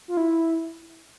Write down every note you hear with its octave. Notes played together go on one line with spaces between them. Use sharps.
F4
E4